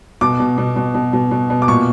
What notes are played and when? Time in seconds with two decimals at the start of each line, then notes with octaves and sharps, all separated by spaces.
0.21 B2 D6
0.39 B2
0.58 B2
0.76 B2
0.95 B2
1.13 B2
1.31 B2
1.50 B2
1.62 D6
1.68 A#2 C#6